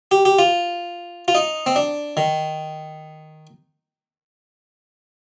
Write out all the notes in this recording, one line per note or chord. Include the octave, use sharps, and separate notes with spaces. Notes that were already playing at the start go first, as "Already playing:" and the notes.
G4
G4
F4
F4
D#4
C4
D4
D#3